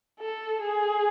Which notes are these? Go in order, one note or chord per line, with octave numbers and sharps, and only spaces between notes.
A4
G#4